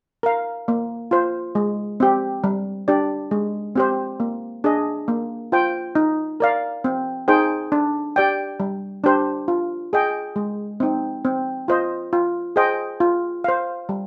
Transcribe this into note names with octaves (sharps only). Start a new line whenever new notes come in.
A#4 F5
A#3
F4 C5
G#3
C4 G4
G3
D4 G4 D5
G#3
C4 G4 C5
A#3
D4 G#4 D#5
A#3
F4 C5 G5
D#4
A#4 D5 F5
C4
D#4 G#4 C5 G5
D4
G4 D5 G5
G3
D4 G4 C5
F4
G#4 D#5 G5
G#3
C4 D#4
C4
F4 C5 D#5
F4
G#4 C5 D#5 G5
F4
C5 F5
G3